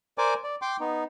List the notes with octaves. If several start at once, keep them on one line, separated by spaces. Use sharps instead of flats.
A#4 C5 D5 G#5 D6
D5
G5 C6 D6
B3 D#4